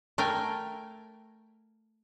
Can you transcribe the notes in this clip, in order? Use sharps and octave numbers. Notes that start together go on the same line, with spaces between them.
A3 A#4 G5 G#5